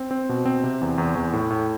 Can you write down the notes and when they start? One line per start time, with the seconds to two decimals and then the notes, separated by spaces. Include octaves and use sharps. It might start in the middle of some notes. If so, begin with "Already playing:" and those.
Already playing: C4
0.11 C4
0.29 B2
0.46 C4
0.64 C3
0.81 E2
0.98 E2
1.15 E2
1.33 A2
1.50 A2